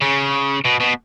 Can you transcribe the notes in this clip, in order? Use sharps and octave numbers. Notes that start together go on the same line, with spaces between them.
C#3
B2
B2